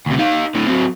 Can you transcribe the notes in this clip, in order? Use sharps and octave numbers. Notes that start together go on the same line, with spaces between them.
D2 C3
D#4 F5
A2 D3
F#3 C4